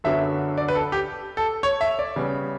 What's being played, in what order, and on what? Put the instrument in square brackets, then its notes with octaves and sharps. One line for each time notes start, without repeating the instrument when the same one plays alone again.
[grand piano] F#2 D3 F#3 B3 E5
D5
B4
A4
G4
A4
C#5
E5
D5
C#3 G3 B3